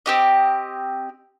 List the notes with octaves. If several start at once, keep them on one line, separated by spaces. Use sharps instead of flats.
C4 G4 D#5